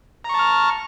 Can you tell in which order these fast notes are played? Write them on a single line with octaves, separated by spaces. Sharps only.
A#5 C#6 A5 F6